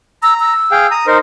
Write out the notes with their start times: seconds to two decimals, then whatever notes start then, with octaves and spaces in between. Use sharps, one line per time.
0.23 A#5 E6
0.40 E6
0.72 G#4 F5 G5
0.91 A#5 D#6
1.07 D#4 A#4 C5